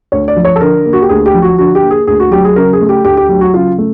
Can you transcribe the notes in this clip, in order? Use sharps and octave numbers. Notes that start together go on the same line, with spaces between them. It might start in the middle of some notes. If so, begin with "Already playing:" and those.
D2 C#5
D5
F3
C#5
A4
D3 A#4
A#3
F#4
G4
D2 G#4
G4
F3
F#4
D3 F#4
G4
A#3
G#4
D2 G#4
F#4
F#3 G4
G#4
C#3 A#4
G#4
A3
G4
D2 G4
G4
F#3 G4
F#4
C#3 F4
A3